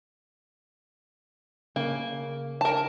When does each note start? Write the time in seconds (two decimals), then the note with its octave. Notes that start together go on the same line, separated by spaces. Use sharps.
1.76 C#3 A#3
2.61 A#4 A5